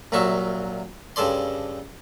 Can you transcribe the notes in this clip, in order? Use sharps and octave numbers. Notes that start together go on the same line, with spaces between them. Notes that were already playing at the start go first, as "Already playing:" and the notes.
C2 A#2 F#3 E5 F5 C#6
G2 C#3 A4 D5 C6